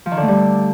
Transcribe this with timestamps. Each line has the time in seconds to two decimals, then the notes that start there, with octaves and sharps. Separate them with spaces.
0.06 F3
0.11 D#3
0.17 D3
0.22 A3
0.28 G3